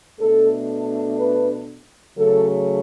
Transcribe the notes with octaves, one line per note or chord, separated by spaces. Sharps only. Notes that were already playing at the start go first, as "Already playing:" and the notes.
B2 A3 D4 A4
B4
C#3 F#3 A3 A4